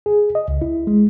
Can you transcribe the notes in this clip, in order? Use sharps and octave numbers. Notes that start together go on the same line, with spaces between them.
G#4
D#5
C#2
E4
G#3